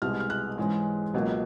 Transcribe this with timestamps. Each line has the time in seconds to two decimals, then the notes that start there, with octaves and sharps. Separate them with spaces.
0.02 C2 B2 G#3 F6
0.20 F6
0.30 F#6
0.58 G#2 E3 G#3 C#4
1.14 C#2 B2 F#3 A#3